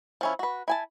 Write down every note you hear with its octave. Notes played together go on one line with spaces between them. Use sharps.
F3 C#4 E4
F#4 B4
E4 G#5 A5